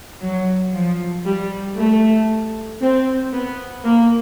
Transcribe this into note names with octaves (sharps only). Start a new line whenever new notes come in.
F#3
F3
G3
A3
C4
B3
A#3